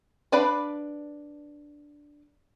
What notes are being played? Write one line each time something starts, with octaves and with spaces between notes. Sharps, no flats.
D4 B4 D5 F5 B5